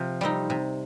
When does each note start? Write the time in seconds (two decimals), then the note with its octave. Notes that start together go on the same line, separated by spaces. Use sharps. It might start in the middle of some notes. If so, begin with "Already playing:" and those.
Already playing: C3 F3
0.21 G3 C4 D#4
0.50 C3